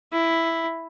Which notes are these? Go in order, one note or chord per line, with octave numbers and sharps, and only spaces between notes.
E4